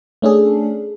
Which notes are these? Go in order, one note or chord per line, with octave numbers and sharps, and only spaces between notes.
A3 C#4 D4 G#4 A4